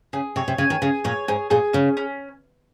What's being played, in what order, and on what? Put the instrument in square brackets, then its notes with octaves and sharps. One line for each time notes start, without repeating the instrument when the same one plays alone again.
[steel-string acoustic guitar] C#3 [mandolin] G#4
[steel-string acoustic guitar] C3 [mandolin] C#5
[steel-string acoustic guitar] C3
[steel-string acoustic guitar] C#3 [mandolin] G#5
[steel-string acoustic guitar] D#3
[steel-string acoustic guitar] C#3 [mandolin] G#4
[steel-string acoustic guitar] A#2 [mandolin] C#5
[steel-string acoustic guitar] G#2 [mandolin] G#4
[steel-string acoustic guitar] A#2 [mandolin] G#4
[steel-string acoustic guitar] C#3 [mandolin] C#4
[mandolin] C#4